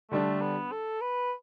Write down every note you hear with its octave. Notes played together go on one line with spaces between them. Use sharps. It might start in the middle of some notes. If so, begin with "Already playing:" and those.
D3 G3 A3 D4
B3
A4
B4